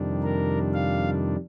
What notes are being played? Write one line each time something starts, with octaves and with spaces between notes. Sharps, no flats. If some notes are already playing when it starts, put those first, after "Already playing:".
Already playing: F2 C3 D#3 G3 D4
A#4
F5